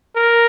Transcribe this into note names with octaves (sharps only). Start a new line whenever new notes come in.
A#4